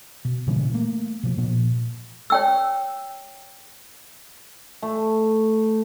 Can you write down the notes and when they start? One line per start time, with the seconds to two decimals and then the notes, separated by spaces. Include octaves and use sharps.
0.25 B2
0.47 A#2 C#3 E3 G3
0.74 A3 A#3
1.23 B2 F3
1.38 A#2 F3
2.30 C#5 G5 E6
4.82 A3